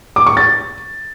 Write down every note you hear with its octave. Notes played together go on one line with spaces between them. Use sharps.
D6
C#6
A6